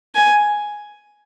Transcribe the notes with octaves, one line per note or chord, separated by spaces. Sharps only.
G#5